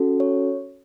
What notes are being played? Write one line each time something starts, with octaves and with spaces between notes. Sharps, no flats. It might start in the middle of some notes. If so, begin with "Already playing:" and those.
Already playing: C#4 F#4 A4
C#5